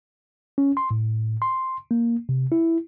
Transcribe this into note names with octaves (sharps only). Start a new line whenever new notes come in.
C#4
C6
A2
C6
A#3
C3
E4